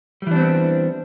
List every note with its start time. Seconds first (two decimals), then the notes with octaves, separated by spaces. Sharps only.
0.22 G3
0.27 E3
0.31 D4
0.36 C4
0.41 B3